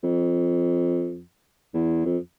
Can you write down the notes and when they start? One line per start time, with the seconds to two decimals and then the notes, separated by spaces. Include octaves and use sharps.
0.03 F2
1.74 E2
2.05 F2